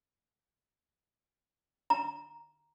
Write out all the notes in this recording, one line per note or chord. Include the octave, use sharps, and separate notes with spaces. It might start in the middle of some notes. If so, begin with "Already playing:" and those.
A#5